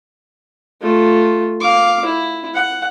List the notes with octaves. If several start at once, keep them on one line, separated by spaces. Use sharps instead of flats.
A3 F4
F5 D6
E4
F#5